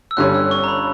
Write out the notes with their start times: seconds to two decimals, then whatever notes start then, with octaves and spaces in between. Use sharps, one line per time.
0.11 E6
0.17 G1 G2 D3 G3 C#4 F#6
0.34 E6
0.51 C#6
0.64 A#5
0.68 B5